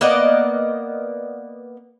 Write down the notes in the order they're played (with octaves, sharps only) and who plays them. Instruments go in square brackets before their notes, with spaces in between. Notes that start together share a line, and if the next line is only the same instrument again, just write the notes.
[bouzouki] A#3 B3 D5 D#5